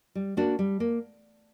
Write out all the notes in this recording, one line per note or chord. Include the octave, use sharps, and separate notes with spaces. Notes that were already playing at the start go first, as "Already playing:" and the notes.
G3
A#3 D4 F#4
G3
A#3